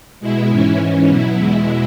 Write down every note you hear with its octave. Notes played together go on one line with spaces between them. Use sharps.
B2 G#3 E4
G#2 E3 C#4 E4
G#2 E3 C#4
B2 F#3 E4
E2 B2 G#3 E4